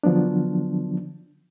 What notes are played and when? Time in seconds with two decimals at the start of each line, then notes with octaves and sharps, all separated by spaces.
0.03 D3 F3 F#3 B3 D4